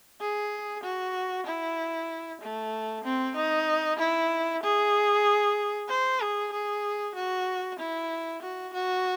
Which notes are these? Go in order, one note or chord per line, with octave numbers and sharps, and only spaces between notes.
G#4
F#4
E4
A3
C4
D#4
E4
G#4
C5
G#4
G#4
F#4
E4
F#4
F#4